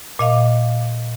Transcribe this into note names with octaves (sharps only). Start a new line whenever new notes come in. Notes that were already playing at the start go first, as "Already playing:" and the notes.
A#2 D#5 F5